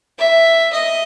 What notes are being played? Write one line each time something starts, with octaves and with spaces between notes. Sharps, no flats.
E5
D#5